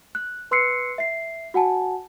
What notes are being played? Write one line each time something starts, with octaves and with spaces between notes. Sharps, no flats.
F#6
B4 C6 E6 F#6 C7 C#7
E5 C7
F#4 F#5 G#5 A5